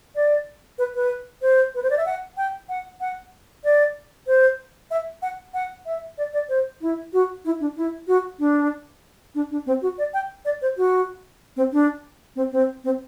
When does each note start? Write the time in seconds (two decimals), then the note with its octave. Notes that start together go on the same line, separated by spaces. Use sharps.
0.15 D5
0.78 B4
0.95 B4
1.42 C5
1.75 B4
1.83 C5
1.90 D5
1.97 E5
2.06 F#5
2.37 G5
2.69 F#5
3.01 F#5
3.64 D5
4.27 C5
4.91 E5
5.22 F#5
5.54 F#5
5.86 E5
6.18 D5
6.33 D5
6.49 C5
6.81 E4
7.13 F#4
7.45 E4
7.60 D4
7.76 E4
8.07 F#4
8.39 D4
9.35 D4
9.51 D4
9.66 C4
9.82 F#4
9.98 D5
10.14 G5
10.45 D5
10.62 C5
10.77 F#4
11.56 C4
11.72 D4
12.36 C4
12.52 C4
12.84 C4